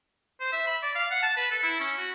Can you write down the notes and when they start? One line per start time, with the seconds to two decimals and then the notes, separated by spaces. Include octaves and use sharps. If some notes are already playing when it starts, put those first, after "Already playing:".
0.40 C5
0.52 E5
0.67 B5
0.83 D5
0.95 F5
1.11 F#5
1.23 A5
1.37 B4
1.51 A4
1.63 E4
1.80 C#4
1.98 F#4